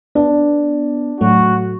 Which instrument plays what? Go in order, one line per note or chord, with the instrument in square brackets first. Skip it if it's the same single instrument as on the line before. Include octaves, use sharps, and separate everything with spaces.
[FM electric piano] B3 [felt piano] D4
[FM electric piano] A2 F#3 A3 [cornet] F#4